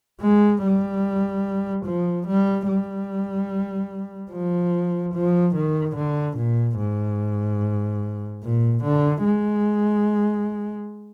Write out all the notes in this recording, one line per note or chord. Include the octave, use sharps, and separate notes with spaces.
G#3
G3
F3
G3
G3
F3
F3
D#3
D3
A#2
G#2
A#2
D3
G#3